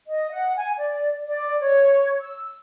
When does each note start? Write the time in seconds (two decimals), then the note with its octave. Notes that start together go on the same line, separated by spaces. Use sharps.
0.07 D#5
0.31 F#5
0.55 G#5
0.78 D5
1.25 D5
1.59 C#5
2.21 E6